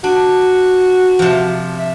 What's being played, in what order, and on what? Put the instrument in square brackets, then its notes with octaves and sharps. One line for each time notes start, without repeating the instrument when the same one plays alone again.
[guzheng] D4 [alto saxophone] F#4
[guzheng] C3 F3
[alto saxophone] E5